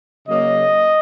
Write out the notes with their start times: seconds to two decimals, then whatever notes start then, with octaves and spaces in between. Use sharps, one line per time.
0.26 C#3 F#3 A#3 D#5